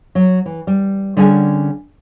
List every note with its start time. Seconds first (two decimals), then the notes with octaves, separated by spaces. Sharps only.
0.15 F#3
0.46 E3
0.67 G3
1.17 D3 G3 C#4 G#4 A#4 G#5